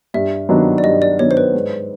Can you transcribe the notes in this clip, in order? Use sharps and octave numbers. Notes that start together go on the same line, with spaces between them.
G2 E5
D#3 F#3 B3 D4
D5
G2 D#5
D5
D#3 F#3 B3 D4 C#5
C5
B4
G#2